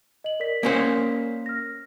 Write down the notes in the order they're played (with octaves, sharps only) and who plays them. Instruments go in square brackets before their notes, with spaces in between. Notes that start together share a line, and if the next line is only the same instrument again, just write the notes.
[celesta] D#5 F#7
A#4 D5 B6
[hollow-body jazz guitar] A#3 C#4 C5
[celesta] F6 A#6